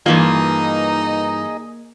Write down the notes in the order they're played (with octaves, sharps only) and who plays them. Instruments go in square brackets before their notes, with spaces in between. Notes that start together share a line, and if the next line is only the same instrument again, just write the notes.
[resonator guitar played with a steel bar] G2 E3 F4 [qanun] A#3 [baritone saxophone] D#4 [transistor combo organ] G#4 D#5